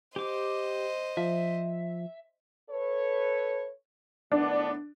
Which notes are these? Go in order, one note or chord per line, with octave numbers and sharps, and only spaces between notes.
G4 C5 D#5 D6
F3 E5
A4 B4 C#5
A2 D#3 B3 D4